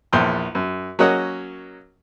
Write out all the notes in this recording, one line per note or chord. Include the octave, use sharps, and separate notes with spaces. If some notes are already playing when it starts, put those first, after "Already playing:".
A#1 E2 G5 C6 D#6
F#2
F#3 A#3 C#4 D#5 F#5